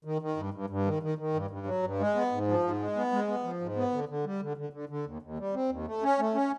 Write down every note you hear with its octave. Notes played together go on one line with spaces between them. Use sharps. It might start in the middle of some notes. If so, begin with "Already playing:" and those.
D#3
D#3
G2
G2
G2
D#3
D#3
D#3
G2
G2
F#3
G2
G#3
B3
G#2
F3
G#2
G#3
B3
G#3
B3
F3
G#2
B3
D3
D3
G3
D3
D3
D3
D3
D#2
D#2
G3
C4
D#2
A3
C#4
A3
C#4